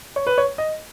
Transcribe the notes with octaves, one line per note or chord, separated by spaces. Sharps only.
C#5
B4
C#5
D#5